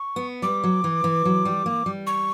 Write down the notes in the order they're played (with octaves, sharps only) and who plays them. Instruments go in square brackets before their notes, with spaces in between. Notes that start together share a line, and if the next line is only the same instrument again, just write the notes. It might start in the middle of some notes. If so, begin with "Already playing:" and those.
Already playing: [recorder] C#6
[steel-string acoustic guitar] B3
[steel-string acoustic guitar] G3 [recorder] D6
[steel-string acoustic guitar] F#3
E3
E3
F#3
G3
A#3
G3
[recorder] C#6